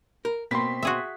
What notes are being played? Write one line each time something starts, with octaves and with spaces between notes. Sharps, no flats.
A#4
B2 A#3 C4 C6 B6
F#4 G#4 E5